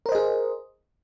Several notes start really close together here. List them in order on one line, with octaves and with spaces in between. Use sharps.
A#4 C5 D#5 G#4